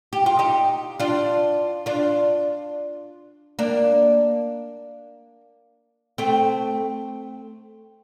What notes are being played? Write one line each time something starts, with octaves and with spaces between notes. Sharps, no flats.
G4
F4
D#4 G4
D4 F4
D4 F4
A#3 D4
A3 C4